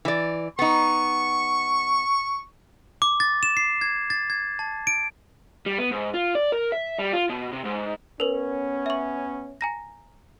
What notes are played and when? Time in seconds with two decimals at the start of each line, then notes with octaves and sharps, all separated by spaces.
0.05 E3 D5
0.59 B3 D#4 C#6
3.02 D6
3.20 A6
3.43 E7
3.57 C7
3.81 G#6
4.10 A6
4.30 G#6
4.59 A5
4.87 D7
5.66 G3
5.78 B3
5.91 G#2
6.14 F4
6.35 D5
6.52 A#4
6.72 E5
6.99 G3
7.13 F4
7.30 B2
7.52 C3
7.64 G#2
8.20 B3 C#4 A#4 B4
8.86 E5 C#6
9.61 G#5 A#5 A#6